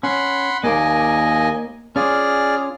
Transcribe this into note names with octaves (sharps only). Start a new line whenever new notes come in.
C#4 F#5 B5 C6
D#2 A#3 A#4 D5 D#5 G#5
C#4 F4 G#4 D5 F6